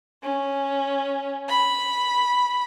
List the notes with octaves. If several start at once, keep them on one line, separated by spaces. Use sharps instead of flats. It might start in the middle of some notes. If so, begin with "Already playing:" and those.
C#4
B5